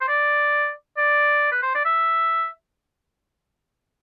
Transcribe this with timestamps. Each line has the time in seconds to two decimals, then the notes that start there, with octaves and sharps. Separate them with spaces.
0.01 C5
0.08 D5
0.97 D5
1.52 B4
1.62 C5
1.75 D5
1.85 E5